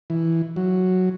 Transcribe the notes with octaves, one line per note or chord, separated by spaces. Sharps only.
E3
F#3